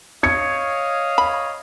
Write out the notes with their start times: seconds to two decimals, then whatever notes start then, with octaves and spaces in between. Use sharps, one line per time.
0.23 C#5 D#5 F5 G#6 C#7
1.18 B5